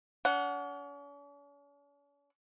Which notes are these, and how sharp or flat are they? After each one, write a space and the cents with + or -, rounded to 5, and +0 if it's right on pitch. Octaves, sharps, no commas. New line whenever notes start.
C#4 +45 F#5 +0